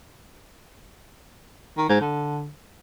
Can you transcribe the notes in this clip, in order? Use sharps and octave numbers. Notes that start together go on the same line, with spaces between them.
D#3
G#2
D3